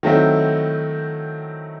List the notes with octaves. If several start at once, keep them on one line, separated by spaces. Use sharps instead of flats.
D#3 F#3 A3 C4 E4